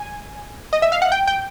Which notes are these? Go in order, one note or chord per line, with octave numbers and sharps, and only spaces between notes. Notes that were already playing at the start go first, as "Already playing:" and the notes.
Already playing: G#5
D#5
E5
F5
F#5
G5
G5